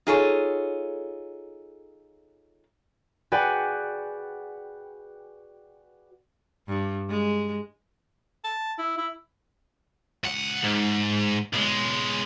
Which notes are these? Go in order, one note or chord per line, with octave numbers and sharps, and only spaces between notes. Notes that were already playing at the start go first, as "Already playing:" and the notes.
D#4 F4 G#4 A4 C#5
F#4 G#4 B4 D5 F#5 G5
G2
G#3
A5
E4
E4
C#2 F#5
G#2
B1 G#3